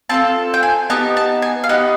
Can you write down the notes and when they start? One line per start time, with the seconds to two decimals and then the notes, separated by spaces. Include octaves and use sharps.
0.09 C4 F4 A4 A5
0.54 G5
0.63 G#5
0.90 B3 D#4 G4 A5
1.17 A5
1.42 G#5
1.64 F5
1.69 B3 D#4 G4 F#5